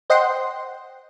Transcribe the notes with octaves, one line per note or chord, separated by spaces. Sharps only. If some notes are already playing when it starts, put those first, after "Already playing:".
C5 D#5 F#5 G5 C6